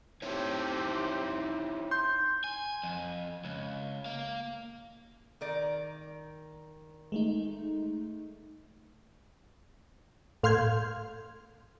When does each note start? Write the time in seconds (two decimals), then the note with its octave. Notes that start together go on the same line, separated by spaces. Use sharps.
0.22 C4 D#4 E4 G4 C#5
1.91 C6 G6
2.44 G#5
2.83 F2
3.45 C#2
4.06 A#3 F5
5.41 D#3 A#4 D5
7.12 G#3 A3 D#4
10.43 A2 F5 C6 F6 G6 G#6